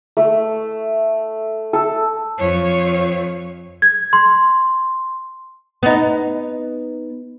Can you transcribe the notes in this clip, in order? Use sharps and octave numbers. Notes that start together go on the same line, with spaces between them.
A3
A4
F2 C#5
G#6
C6
B3 D#4